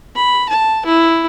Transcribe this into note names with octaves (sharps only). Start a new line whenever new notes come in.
B5
A5
E4